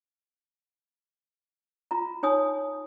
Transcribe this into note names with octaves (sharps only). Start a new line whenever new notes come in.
F4 A#5
D#4 C#5 G#5 D#6